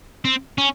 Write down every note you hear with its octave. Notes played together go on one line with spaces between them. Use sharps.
C4
C#4